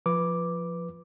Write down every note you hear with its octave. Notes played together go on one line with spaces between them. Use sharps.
F3 B4 D6